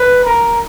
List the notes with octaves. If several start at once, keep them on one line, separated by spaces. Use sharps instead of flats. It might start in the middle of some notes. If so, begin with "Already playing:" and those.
Already playing: B4
A#4